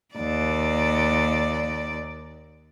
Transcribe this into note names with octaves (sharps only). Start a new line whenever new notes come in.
D#2 D5